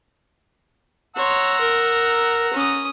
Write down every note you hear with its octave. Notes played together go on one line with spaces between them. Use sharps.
C#5 F#5 A#5 C6 E6
A#4
C#4 D#6